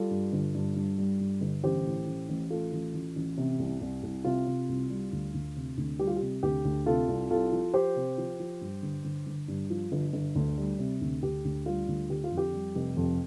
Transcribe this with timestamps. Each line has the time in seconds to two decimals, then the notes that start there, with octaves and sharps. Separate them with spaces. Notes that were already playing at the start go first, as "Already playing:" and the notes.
Already playing: G3 F4 A4
0.11 G2
0.33 G1
0.54 G2
0.76 G2
0.98 G3
1.20 G2
1.41 G1
1.64 A1 G4 C5
1.85 A2
2.07 A1
2.29 A1
2.50 A3 F4 A4
2.72 A1
2.94 A1
3.16 A1
3.37 C3
3.60 C2
3.81 C2
4.03 C2
4.24 C3 F4
4.46 C3
4.69 C2
4.90 G3
5.13 D2
5.34 D2
5.56 C3
5.78 D2
5.99 G3 G4
6.07 F4
6.16 G4
6.21 C3
6.43 D2 G4
6.65 D2
6.86 C3 F4 A4
7.08 C2
7.30 C2 F4 A4
7.52 F3
7.74 F3 G4 C5
7.96 C3
8.18 F3
8.40 F3
8.61 G2
8.83 G1
9.05 G1
9.27 G1
9.48 G2
9.70 F3
9.92 G1
10.13 G1
10.35 D2
10.57 G3
10.79 C3
11.01 D2
11.23 D2 G4
11.45 D2
11.66 G3 F4
11.88 D2
12.10 D3 G4
12.24 F4
12.32 F2
12.37 G4
12.53 G3
12.75 F1
12.97 F2